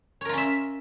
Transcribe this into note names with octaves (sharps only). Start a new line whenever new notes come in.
C#4 F4 A#4 C#5 E5